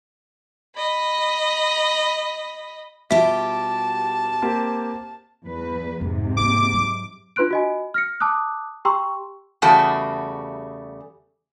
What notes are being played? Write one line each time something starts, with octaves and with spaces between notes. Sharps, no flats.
D#5 B5
B2 G3 F4 G4 E5 A5
A#3 C4 G4
E2 B4
F2 G#2 C3
E3 A#3 D6
F#3
D4 F4 B4 C6 F#6 D7
F#4 D#5 G#5
F6 A#6 C#7
A5 D6 D#6 F#6
G4 G5 A#5 C6 C#6 E6
E2 C#3 G3 A3 F#4 A5